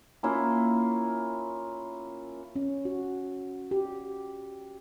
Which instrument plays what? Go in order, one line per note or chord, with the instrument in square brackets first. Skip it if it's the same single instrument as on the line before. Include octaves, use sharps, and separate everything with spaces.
[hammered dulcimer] A#3 C#4 E4 F4
[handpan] C#4
F#4
G4